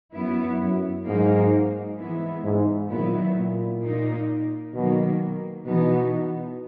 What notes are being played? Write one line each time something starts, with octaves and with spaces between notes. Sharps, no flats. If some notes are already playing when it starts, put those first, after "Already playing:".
F#2 F#3 B3 E4
F#2
G#2 F#3 A#3 D#4
E3 G#3 B3 E4
G#2
A#2 D#3 F#3 B3 E4
A#2
A#2 A#3 D#4
B2 D#3 F#3 A#3
B2 E3 B3 D#4